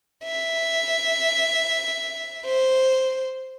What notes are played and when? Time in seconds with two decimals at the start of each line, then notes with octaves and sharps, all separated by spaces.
0.24 E5
2.45 C5